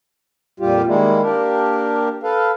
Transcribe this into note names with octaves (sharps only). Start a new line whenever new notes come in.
F2 A#2 G3 F4 G4
D#3 G3 G#3 A#3 E4
A#3 D4 G4 A#4
A4 B4 F5